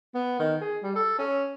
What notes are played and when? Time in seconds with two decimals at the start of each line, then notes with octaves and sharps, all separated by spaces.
0.15 B3
0.39 D#3
0.61 G#4
0.83 G3
0.95 A4
1.19 C#4